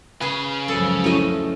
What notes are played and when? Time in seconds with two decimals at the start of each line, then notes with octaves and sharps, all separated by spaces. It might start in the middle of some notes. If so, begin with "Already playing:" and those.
0.21 C#3 G#4 B4 B5
0.68 C#2 F#2 F3 A4
1.04 A3 C#4 E4 F#4 D#5